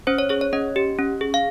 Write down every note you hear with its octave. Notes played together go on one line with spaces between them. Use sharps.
C#4 C5
C#5
G#4 C#5
C#5
C#4 D#5
G4
C#4
G#4
F5